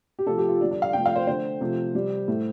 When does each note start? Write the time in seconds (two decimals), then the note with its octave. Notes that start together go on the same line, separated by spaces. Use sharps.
0.19 G4
0.26 C3 F3 A3 A4
0.38 G4
0.49 F4
0.61 D3 D4
0.64 G3
0.71 D4
0.82 F5
0.93 C3 F3 A3 G5
1.06 F5
1.16 C5
1.27 D3 A3 C5
1.61 C3 F3 A3
1.94 C3 G3
2.28 A2 A3